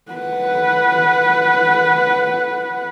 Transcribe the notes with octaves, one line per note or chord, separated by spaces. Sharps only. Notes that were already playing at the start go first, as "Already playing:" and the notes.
B4 F#5